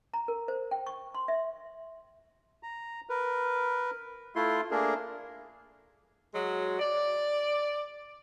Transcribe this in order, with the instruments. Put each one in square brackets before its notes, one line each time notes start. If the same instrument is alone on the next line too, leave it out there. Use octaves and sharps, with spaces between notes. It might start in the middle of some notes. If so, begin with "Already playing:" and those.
[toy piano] A#5
A#4
C5
G5
C#6
C6
E5
[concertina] A#5
A#4 B4
A3 E4 F4 C6
A3 A#3 D4 G#4 A#4
[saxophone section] F#3 G#3 F#4
D5